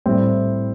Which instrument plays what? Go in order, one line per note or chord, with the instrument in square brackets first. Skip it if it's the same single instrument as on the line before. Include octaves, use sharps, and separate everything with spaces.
[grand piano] A2 G3 C4 E4